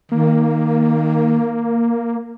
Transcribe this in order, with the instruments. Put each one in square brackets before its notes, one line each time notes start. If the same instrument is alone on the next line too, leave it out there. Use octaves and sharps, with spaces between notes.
[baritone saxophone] D#3 [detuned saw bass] A#3